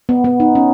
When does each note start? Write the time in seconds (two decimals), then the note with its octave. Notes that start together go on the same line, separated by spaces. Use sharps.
0.09 B3
0.24 B3
0.40 D#4
0.55 C#4